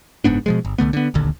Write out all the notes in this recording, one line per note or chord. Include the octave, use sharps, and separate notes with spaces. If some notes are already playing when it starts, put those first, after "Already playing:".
F#1 G#2 B3 D4
B2 F3 G#3
G1
C2 D3 A3 B3
D3 B3
D1 A#1 D#2 D3